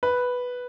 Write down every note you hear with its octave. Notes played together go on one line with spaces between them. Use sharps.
B4